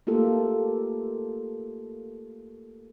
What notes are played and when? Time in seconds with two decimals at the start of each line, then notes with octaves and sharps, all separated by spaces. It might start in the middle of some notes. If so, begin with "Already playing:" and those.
0.07 A3 A#3 F4 G4 A4